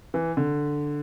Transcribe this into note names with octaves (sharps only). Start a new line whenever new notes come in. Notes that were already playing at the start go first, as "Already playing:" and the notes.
E3
D3